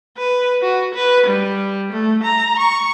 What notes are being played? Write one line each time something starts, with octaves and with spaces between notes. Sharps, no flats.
B4
F#4
B4
G3
A3
A#5
C#6